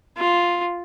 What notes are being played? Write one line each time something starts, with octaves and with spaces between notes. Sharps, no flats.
F4